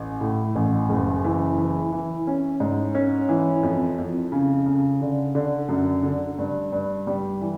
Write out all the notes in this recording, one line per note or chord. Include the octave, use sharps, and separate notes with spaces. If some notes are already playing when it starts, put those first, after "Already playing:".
Already playing: A1
A2
A1
F#1
E3
E3
E3
C#4
G#2
C#4
E3
F2
F2
C#3
C#3
D3
D3
F#2
D3
G2
G2
G3
E3